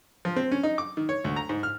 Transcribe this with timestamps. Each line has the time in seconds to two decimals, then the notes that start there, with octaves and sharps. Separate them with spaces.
0.25 F3
0.36 C4
0.51 C#4
0.63 D#4
0.78 D6
0.97 D#3
1.09 C#5
1.24 D2
1.36 A#5
1.49 G#2
1.63 F6